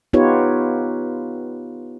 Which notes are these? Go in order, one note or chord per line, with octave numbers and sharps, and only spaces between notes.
B3 D#4 F4 G4 B4 C#5